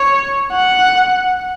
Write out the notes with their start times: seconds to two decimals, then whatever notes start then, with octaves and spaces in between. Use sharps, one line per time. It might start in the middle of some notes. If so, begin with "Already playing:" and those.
Already playing: C#5
0.53 F#5